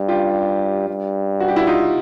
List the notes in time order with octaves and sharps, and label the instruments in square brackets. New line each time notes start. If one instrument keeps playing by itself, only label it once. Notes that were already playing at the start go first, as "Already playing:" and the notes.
Already playing: [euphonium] G2
[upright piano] F4 G4
[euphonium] G2
[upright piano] F#4
G4
E4 F#4
D#4 F4